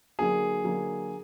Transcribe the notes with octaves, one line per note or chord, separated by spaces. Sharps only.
D3 F#3 A#3 G#4
D3 F#3 A#3